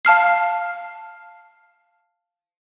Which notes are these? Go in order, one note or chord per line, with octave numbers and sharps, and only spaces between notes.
F5 A5 F6 C7